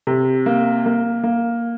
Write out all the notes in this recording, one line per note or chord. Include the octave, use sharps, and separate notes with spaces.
C3
A#3
A#3
A#3